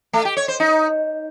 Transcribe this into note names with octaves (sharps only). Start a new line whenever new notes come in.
A3
G4
C#5
C5
D#4